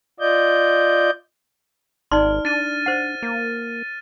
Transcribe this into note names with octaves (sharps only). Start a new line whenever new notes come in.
F4 D5 D#5 G6
G#1 D#4 D5 C6 F6
D4 A6 D#7
C5 F#5
A#3